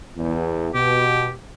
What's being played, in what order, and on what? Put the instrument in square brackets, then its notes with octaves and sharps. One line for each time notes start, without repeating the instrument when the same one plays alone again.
[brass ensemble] E2
[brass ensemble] B2 [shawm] G4